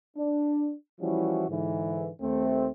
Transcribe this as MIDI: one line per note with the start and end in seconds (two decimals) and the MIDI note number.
0.16 0.73 62
1.00 1.45 52
1.00 1.45 53
1.00 1.45 55
1.00 1.45 61
1.00 1.45 64
1.00 1.45 66
1.49 2.09 44
1.49 2.09 50
1.49 2.09 52
2.21 2.68 39
2.21 2.68 57
2.21 2.68 60